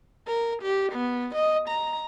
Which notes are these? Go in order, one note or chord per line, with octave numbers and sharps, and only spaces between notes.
A#4
G4
B3
D#5
A#5